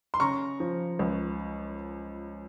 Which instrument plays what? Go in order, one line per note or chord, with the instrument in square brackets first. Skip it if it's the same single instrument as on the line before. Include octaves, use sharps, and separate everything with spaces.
[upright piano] C6
C#3 A#5 C#6
F3
C#2